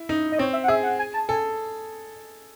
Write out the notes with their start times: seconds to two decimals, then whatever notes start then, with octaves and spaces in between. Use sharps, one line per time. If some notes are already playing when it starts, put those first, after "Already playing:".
Already playing: E4
0.09 D#4
0.32 D#5
0.39 C4 C#5
0.53 E5
0.64 F#5
0.68 G#4 E5
0.83 F#5
0.99 G#5
1.14 A5
1.28 A4 G#5